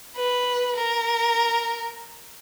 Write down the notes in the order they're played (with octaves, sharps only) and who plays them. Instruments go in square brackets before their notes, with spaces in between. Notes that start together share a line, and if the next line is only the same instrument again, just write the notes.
[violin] B4
A#4